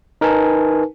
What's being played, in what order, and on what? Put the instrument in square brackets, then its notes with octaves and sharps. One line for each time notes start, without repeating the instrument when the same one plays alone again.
[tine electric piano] D#4 A#4 B4 G#5 A5